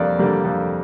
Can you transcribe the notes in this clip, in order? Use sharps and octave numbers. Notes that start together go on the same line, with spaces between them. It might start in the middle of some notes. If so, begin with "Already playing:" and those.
Already playing: F2 D3 G3 A#3 D5
D3 G3 A#3
F2